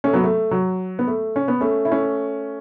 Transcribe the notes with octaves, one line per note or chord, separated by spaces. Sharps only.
A3 C#4
F#3 B3
A3
F#3
B3
A3
C#4
B3
A3 C#4
E4
A3 C#4